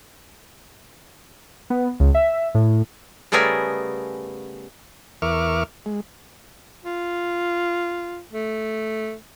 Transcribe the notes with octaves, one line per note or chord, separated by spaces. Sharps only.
B3
C#2
E5
A2
C#3 G3 A3 B3 G#4 A#4
E2 A#4 E5 C#6 D6 F6
G#3
F4
A3